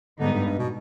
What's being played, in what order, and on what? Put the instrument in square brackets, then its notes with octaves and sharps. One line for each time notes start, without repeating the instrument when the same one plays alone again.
[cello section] G#2 G3 B3 D#4 [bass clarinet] D3
[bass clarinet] G2
G2
B2